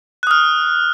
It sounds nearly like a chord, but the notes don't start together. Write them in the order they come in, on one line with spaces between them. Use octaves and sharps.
F#6 D#6 F6